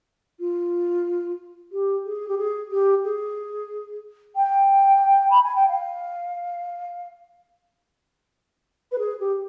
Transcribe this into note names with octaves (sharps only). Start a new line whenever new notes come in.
F4
G4
G#4
G4
G#4
G4
G#4
G5
B5
G#5
G5
F5
B4
G#4
G4